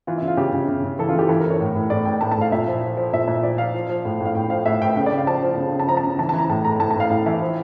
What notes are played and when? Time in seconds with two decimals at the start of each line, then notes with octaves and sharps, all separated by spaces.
0.07 E3 F4
0.18 E4
0.22 C#3
0.28 F4
0.37 C#3 G4
0.53 C#3
0.68 C#3
0.84 C#3
0.99 E3 A4
1.08 F4
1.14 E3
1.19 G4
1.29 E3 A4
1.40 A#4
1.45 E3
1.50 C#5
1.60 A2
1.75 A2
1.90 A2 D5
2.05 A2 G5
2.21 A2 A5
2.31 A5
2.37 A2 F5
2.52 A#2 E5
2.67 F3
2.83 F3
2.97 F3
3.13 A#2 E5
3.28 A#2
3.43 F3 D5
3.58 F3 F5
3.74 F3
3.89 F3
4.05 A2
4.20 A2
4.26 F5
4.35 A2 G5
4.50 F3 F5
4.65 A2 E5
4.81 A2 G5
4.96 C#3 G5
5.06 D5
5.11 C#3
5.17 F5
5.26 F3 A5
5.42 F3
5.57 C#3
5.72 C#3
5.80 A5
5.88 F3 A#5
5.97 A5
6.03 C#3 A#5
6.19 E3 A5
6.29 A5
6.33 E3
6.39 A#5
6.50 A2 A5
6.65 A2 A#5
6.80 A2 A5
6.91 A5
6.96 A2 F5
7.10 A2 F5
7.26 E3 E5
7.41 F3